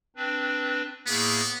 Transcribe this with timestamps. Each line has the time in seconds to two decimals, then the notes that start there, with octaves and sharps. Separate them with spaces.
0.16 C4 D4 B4
1.07 A2 A#3 B3 G#4